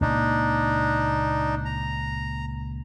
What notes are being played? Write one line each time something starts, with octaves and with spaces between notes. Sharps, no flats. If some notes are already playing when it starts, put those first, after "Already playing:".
C#2 A#2 A#3 D4 D#4
A#5